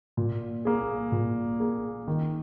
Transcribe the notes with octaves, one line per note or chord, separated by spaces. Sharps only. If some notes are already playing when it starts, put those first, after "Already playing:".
A#2
A#3 G#4
A#2
A#3 G#4
D#3